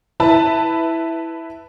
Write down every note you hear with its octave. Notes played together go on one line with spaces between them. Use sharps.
E4 B4 E5 A5 B5